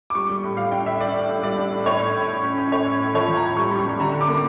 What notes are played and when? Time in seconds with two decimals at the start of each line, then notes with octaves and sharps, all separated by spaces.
0.10 D6
0.15 G3 C#6
0.30 G3
0.43 A2
0.57 G3 F5
0.71 D4 G5
0.86 A2 E5
1.00 D4 D5
1.15 A2
1.29 A2
1.43 G3 D5
1.58 D4
1.72 A2
1.86 A2 C#5
2.00 A2
2.14 A2
2.29 A2
2.43 C#4
2.58 C#4
2.72 A2 C#5
2.86 A2
3.00 A2
3.14 F3 C#5
3.28 F3
3.36 A#5
3.43 A2
3.57 G3 C#6
3.71 G3
3.79 C#6
3.86 G3
4.00 D3 A#5
4.15 D3
4.21 D6
4.28 A#3